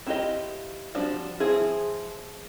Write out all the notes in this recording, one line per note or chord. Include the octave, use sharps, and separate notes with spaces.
C4 E4 F4 G4 D#5
F3 G3 C4 D4 F#4
F3 C4 E4 G#4